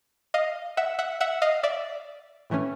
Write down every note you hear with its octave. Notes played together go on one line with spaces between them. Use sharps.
D#5 F5
E5 F#5
E5 F#5
E5 F#5
D#5 F5
D5 E5
A2 E3 A3 C#4